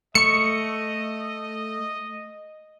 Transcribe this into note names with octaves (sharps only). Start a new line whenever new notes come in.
A3 D#5 C#6 C#7